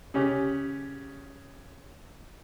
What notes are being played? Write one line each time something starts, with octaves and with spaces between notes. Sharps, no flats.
C#3 C#4 G4